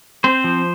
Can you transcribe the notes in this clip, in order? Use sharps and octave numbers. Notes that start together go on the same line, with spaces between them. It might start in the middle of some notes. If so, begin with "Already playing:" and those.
C4 C5
F3